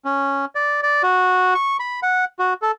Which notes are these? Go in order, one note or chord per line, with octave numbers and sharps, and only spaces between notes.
C#4
D5
D5
F#4
C#6
B5
F#5
F#4
A4